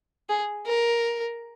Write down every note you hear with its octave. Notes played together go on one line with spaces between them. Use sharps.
G#4
A#4